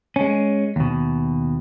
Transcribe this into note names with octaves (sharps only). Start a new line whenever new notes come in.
G#3 C#4
D#2 B2